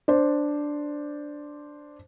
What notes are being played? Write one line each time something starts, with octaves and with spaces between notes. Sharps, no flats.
D4 C5 D5